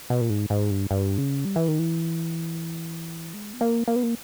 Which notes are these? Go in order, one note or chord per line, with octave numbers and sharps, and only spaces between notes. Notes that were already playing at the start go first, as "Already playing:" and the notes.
B2
A#2
G#2
G#2
G2
G2
C#3
G3
E3
D#3
E3
G#3
B3
A#3
A#3
B3
A#3